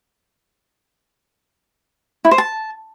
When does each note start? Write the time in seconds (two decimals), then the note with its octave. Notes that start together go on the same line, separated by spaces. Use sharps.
2.25 E4
2.31 C5
2.38 A5